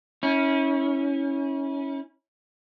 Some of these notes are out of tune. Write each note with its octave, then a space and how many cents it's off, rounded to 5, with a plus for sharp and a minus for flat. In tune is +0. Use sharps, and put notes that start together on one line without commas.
C#4 +0 E4 -35